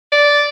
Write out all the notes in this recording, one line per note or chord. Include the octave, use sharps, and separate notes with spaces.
D5